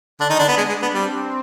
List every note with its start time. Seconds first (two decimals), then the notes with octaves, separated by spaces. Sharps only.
0.20 D3 D4
0.30 D#3 D#4
0.39 D3 D4
0.48 B3
0.57 G#3 D4
0.69 G#3
0.82 B3
0.94 G3 C4